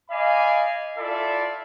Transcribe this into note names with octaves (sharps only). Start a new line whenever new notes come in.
D5 D#5 F5 G#5 B5
E4 F4 A4 D5 E5